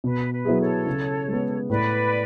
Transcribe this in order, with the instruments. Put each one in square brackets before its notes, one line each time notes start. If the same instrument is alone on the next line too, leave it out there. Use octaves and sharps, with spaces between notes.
[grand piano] B2 [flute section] B4
[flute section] B4
[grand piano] F#3 B3 E4 G#4
[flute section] A4 C#5
[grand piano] C#3
G#3 B3
[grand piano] A2 [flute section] B4 D5